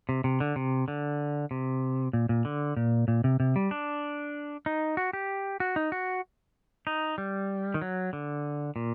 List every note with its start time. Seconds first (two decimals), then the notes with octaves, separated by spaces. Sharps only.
0.09 C3
0.24 C3
0.40 D3
0.56 C3
0.88 D3
1.51 C3
2.13 A#2
2.29 A#2
2.45 D3
2.77 A#2
3.08 A#2
3.24 C3
3.40 C3
3.56 G3
3.71 D4
4.66 D#4
4.97 F#4
5.13 G4
5.60 F#4
5.76 D#4
5.92 F#4
6.87 D#4
7.18 G3
7.74 D#3
7.82 F#3
8.13 D3
8.76 A#2